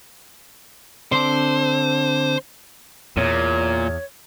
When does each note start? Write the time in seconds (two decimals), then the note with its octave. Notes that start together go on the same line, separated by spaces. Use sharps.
1.12 D3 C4 D4 C5
3.17 E2 A#2 C#5